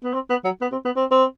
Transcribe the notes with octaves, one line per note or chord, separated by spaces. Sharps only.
B3
C4
B3
F#3
B3
C4
B3
C4
C4